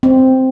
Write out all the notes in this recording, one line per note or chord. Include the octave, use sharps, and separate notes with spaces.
C4